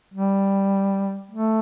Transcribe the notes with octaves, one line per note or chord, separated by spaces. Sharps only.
G3
A3